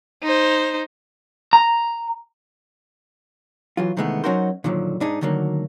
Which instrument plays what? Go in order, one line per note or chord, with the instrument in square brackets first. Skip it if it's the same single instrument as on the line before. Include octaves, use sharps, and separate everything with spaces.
[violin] D#4 C5
[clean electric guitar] A#5
[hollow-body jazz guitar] E3 F#3 F4
C3 D#3 E3 G#3 A3 B3
F#3 C#4 D#4 F#4 A#4 C5
A#2 D3 D#3 F3 F#3
G#2 D4 D#4 G#4
D2 D3 D#3 F#3 A#3